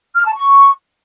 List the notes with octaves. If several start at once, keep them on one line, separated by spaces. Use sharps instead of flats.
F6
A5
C#6